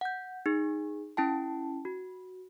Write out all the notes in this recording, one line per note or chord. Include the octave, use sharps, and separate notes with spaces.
F#5 G6
D#4 G#4
C#4 E4 G5 A5
F#4